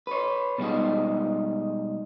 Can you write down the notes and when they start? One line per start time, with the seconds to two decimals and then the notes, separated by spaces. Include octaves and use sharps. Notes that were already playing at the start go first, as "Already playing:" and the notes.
0.07 B4 C#5
0.58 B2 G3 G#3 D#4